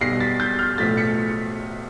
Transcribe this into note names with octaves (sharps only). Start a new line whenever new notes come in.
B1 B2 G3 A#6 C7
A6 B6
G6 A6
F6 G6
B1 A2 F3 A3 A6 B6
B6 C#7